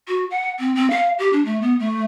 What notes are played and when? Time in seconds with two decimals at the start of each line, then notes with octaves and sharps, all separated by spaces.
0.08 F#4
0.31 F#5
0.59 C4
0.75 C4
0.90 F5
1.19 G4
1.33 D4
1.45 A3
1.62 B3
1.80 A3